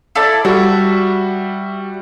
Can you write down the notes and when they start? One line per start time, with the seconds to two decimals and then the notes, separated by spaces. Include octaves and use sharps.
0.15 E4 A4 D5
0.45 G3 F#4 E5